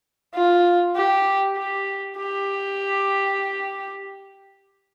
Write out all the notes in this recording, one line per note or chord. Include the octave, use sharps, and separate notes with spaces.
F4
G4
G4
G4